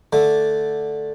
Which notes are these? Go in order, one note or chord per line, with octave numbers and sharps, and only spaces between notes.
D3 A3